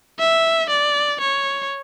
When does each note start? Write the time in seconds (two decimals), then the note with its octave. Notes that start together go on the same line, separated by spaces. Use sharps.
0.19 E5
0.70 D5
1.20 C#5